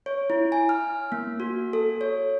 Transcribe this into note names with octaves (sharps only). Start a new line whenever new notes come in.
C#5
E4
G#5
F6
A#3
F#4
A4
C#5